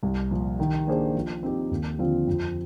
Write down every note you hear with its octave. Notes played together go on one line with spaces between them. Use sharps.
C2
A#2 F3
D#3
A#3 D4 G#4 C5
F3
C4 D#4 G4
D#2
D3 F3 C4 F4
F2